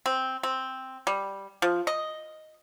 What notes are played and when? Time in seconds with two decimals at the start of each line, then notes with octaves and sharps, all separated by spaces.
0.06 C4
0.43 C4
1.07 G3
1.62 F3
1.87 D#5